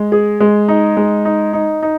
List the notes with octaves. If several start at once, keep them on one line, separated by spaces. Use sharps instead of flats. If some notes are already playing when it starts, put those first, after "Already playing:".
Already playing: G#3
G#4
G#3
D#4
G#3
D#4
D#4
D#4